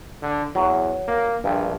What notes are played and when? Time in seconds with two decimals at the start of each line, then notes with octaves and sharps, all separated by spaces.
0.22 D3
0.55 E2 F#3
1.08 A#3
1.44 A#1 G2